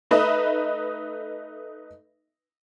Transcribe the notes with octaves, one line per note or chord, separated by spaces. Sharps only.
A3 D#4 B4 D#5 E5